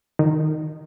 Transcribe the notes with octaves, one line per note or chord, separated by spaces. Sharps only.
D#3